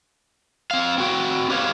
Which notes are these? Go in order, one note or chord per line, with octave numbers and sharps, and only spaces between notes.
C4 F5
C4 F#4 G5
G4 B4 C#5 F5